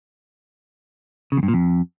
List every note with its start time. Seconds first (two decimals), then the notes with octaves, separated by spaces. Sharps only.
1.32 C#3
1.37 E2
1.43 G2
1.48 A#2
1.54 F2